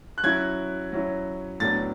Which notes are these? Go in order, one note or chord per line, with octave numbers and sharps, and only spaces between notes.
F#6
F#3 C#4 E4 G#6
F#3 C#4 E4
A2 F#3 B3 D4 A6